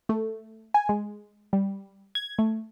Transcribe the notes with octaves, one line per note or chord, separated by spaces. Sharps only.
A3
G#5
G#3
G3
G#6
A3